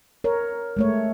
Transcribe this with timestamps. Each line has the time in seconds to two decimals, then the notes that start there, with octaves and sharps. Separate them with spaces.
0.24 A#4 C#5
0.77 G#3 A3 C#5